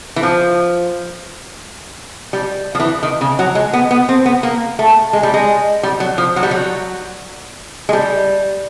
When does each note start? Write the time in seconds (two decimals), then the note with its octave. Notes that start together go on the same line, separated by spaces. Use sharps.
0.16 E3
0.23 F3
2.33 G3
2.75 F3
2.80 E3
3.03 D#3
3.21 C#3
3.39 F#3
3.55 G#3
3.73 B3
3.91 B3
4.09 C4
4.26 B3
4.43 A#3
4.79 A3
5.13 G#3
5.23 G3
5.34 G#3
5.83 G3
6.00 F#3
6.18 F3
6.36 F#3
6.43 G3
6.51 F#3
7.89 G#3
7.93 G3